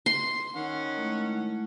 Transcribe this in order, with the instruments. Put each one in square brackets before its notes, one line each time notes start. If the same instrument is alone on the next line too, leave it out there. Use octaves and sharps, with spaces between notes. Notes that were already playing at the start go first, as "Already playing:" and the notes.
[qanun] C6
[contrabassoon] D#3 [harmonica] C#4 F#5
[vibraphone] G#3 A3 E4